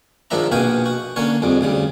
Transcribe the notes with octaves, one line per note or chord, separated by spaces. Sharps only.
G#2 D#3 F3 D4 E5 A#5
A#1 B2 F#4 F5 G5 G#5
F#4
D3 A#3 C#4 C#5
F2 G#2 G3
D2 C#3 G3